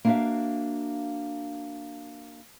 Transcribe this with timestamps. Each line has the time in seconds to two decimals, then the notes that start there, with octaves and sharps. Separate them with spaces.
0.05 A#3 D4 E4 F#4 E5 F5